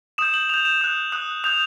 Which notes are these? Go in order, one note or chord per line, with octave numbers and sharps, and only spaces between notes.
D#6 G6 E7
F#7
D#6 G6 F7
E7
D#6 F#6
D#6 F#6
D#6 G6 F7